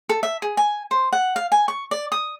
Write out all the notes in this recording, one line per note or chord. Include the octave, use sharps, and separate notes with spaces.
A4
E5
G#4
G#5
C5
F#5
F5
G#5
C#6
D5
D#6